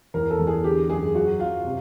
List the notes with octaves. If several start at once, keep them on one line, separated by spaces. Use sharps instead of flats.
E2 A#4
A4
E2
G#4
D3 G4
F#2 G#4
F#3 F#4
F#2 F4
C3